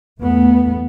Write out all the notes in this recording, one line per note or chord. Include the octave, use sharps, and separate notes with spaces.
E2 A3 B3